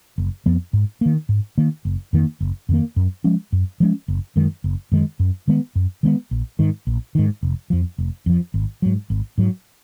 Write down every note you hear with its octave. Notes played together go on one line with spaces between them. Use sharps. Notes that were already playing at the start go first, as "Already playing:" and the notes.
F#1
F2 F3 B3
G#2
D#3 A#3
G#2
D#3 A#3
F#1
F2 D#3 A#3
F#1
F2 D#3 A#3
F#2
F3 G#3 C#4
F#2
F3 G#3 C#4
F#1
F#2 D#3 G#3
F#1
F#2 D#3 G#3
F#2
D#3 G#3 B3
F#2
D#3 G#3 B3
A#1
G#2 D#3
A#1
G#2 D#3
F1
F2 F3
F1
F2 F3
G#1
G#2 F#3
G#1
G#2 F#3